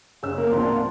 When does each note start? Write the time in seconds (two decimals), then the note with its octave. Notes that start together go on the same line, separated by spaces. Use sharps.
0.23 F#1 G#4 C#5 E6
0.38 A#3 A#4
0.51 D2 A2 F3 C4 D4 C6